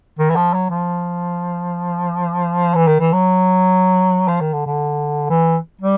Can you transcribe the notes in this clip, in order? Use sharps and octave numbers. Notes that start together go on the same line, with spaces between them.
D#3
E3
F3
F#3
F3
E3
D#3
E3
F#3
F3
D#3
D3
D3
E3
G3